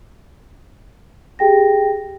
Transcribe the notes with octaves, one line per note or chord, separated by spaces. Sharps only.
G4 G#4 G5 A#6